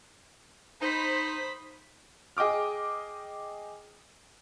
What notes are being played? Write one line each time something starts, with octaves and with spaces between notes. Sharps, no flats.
D#4 C5 B5 B6
G#4 D#5 G5 D6 F6